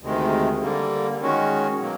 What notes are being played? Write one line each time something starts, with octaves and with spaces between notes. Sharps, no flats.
D2 C3 D#3 G#3
D3 G3 A#3
D#3 G#3 C#4 F#4
B2 F#3 A#3